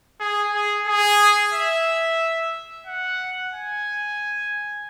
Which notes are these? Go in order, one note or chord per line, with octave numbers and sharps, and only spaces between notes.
G#4
G#4
G#4
E5
F#5
G#5